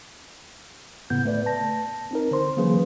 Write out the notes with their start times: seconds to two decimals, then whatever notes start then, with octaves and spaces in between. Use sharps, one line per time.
1.10 A2 C#3 B3 G6
1.25 A3 B4 D5
1.46 A5 A#6
2.11 C4 D#4 A#4
2.31 D3 C5 C6
2.57 E3 F#3 A#3 C#4 G#4 B4